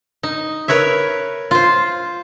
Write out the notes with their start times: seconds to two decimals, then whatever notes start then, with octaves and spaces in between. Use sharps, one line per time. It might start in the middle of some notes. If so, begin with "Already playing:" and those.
0.23 D#4
0.68 A#4 B4 C#5 E5
1.51 F4 C5